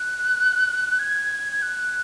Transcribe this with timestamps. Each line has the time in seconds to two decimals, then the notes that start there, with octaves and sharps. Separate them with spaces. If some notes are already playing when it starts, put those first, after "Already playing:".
Already playing: F#6
0.99 G#6
1.52 G#6
1.62 F#6